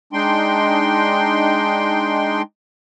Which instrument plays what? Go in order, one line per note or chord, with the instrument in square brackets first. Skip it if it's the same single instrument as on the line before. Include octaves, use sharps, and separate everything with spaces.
[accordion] G#3 D4 D#4 G5 C6